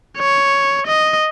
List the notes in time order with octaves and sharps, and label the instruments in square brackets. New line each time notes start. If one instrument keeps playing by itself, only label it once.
[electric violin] C#5
D#5